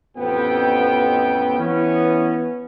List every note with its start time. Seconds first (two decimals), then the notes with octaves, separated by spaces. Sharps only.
0.17 A1 F2 B3 G5
1.59 E3 B3 C#4